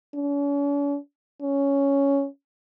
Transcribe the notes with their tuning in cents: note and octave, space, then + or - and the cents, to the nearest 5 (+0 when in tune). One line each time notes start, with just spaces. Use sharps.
C#4 +45
C#4 +5